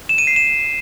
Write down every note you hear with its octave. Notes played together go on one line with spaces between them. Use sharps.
E7
D#7
C7
E7